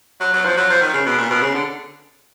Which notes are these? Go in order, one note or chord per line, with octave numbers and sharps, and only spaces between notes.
F#3
F#3
F3
F#3
F3
D#3
C#3
B2
A#2
B2
C#3
D3